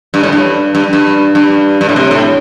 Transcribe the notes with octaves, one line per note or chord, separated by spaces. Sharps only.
G2
A2
G2
G2
G2
G2
G2
A2
C3
A2